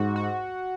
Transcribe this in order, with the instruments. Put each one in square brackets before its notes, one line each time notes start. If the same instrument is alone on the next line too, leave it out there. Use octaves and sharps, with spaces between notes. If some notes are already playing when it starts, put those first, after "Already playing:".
Already playing: [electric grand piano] G#2 [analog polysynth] F#4
[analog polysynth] F#4